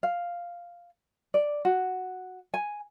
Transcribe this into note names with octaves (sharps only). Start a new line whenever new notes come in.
F5
D5
F#4
G#5